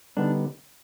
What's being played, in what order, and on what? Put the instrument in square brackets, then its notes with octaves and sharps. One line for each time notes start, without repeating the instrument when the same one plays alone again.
[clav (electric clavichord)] D3 G3 B3 D#4 [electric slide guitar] D4